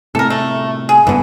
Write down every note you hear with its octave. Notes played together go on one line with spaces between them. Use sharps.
A2 C3 A4 A#4
A3
G#4
F#1 G2 D3 E3 B3